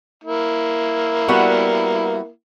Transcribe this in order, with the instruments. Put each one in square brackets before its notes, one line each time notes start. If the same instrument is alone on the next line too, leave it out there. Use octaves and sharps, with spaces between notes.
[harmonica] A#3 E4
[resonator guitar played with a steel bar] G3 B3 F#4